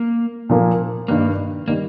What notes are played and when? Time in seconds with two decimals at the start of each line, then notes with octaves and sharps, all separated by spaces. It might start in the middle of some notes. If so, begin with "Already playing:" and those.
Already playing: A#3
0.49 A#2 F3 A#3
1.08 G2 D#3 G3 A#3
1.68 D#3 G3 A#3